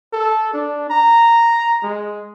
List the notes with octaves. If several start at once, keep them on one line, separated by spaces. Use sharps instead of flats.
A4
D4
A#5
G#3